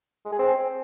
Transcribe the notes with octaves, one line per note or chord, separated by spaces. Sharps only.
G#3
G#4
C4